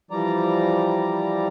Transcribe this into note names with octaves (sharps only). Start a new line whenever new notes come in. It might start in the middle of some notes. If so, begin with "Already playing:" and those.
E3 F3 G3 D5 A#5